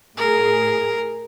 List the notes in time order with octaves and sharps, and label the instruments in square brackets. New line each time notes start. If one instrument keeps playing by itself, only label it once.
[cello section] A2 G#4 [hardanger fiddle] A#4